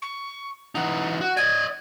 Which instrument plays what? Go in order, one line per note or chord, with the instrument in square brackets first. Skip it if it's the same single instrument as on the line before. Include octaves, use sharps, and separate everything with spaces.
[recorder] C#6
[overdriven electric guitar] E3 D#4 [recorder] F#5
[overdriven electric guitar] F#4
[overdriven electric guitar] D5 D#5 [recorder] G#6